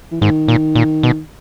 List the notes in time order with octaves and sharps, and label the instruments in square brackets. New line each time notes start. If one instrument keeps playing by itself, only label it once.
[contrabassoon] E3
[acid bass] G#2 [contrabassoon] D#3
[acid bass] A#2
A#2
B2